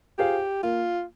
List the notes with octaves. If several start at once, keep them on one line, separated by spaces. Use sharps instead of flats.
F4 G4 G#4 C5 F5
A#3 F4